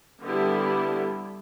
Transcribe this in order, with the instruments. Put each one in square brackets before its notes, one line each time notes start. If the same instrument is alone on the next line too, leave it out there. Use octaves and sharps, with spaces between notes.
[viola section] D3 G3 B3 E4 G4